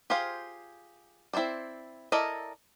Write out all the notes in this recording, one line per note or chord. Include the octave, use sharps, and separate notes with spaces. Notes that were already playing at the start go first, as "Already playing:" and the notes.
F4 G4 G#4 C5 F5
C4 E4 G#4 C5 D5
E4 A4 A#4 D5 D#5